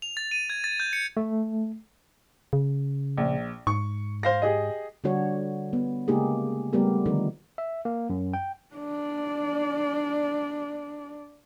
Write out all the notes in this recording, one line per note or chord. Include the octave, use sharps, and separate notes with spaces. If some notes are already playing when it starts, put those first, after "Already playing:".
F7
A6
D#7
G#6
A6
G6
C#7
A3
C#3
A#1
G#2 C#6
C5 F5 A#6
G4 G#4 D#5
D3 G3 D4 F#4 C#5
B3
C#3 G#3 A#3 D#4 G4 G#4
G3 A3 B3 G4 A#4
D3 D#3 F3 D#4
E5
A#3
F#2
G5
D4 D5